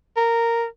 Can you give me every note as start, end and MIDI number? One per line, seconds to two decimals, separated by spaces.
0.17 0.65 70